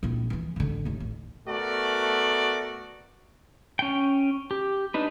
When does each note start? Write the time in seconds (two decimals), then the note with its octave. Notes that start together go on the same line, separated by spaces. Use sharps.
0.03 A#1 E4
0.30 E3 F3
0.56 A1 D3
0.85 D#2 A3
1.00 A1
1.47 A3 B3 F#4 A#4 D5
3.79 C#4 G5
4.51 G4
4.94 D4 D#4 B4